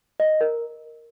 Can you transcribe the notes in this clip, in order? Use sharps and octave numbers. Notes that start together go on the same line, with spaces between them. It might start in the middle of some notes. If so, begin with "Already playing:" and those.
D#5
A#4